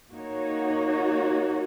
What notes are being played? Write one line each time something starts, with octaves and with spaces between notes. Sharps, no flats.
A#3 D#4 F#4 C#5